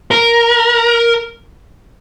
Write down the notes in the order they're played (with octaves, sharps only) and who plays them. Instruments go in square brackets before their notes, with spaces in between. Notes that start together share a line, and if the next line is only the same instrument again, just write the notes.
[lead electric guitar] A#4